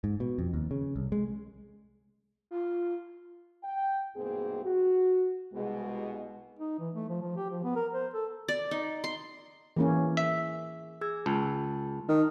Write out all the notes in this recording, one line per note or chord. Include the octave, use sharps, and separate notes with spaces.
G#2
B2
F2
D#2
C#3
C2
G#3
F4
G5
C2 G#2 B2 A#3 C4 G#4
F#4
C2 B2 G#3
D#4
E3
A3
F3
F3
G4
F3
B3
A#4
C5
A4
D5
D#4
C6
E3 A#3 C#4 G#4
E5
G#4 E6 G#6
C#2 A5
D#3 D#4 F6